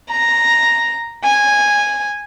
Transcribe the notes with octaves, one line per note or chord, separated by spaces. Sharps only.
A#5
G#5